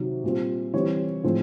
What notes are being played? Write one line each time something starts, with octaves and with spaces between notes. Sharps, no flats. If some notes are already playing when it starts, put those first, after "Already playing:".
Already playing: C3 D#3 F#3
A#2 G3 C4
E3 G3 C4 C#5
A2 F3 G#3 C4